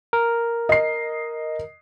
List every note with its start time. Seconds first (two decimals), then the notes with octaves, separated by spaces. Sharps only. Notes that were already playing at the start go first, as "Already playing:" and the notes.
0.13 A#4
0.69 D#5 C7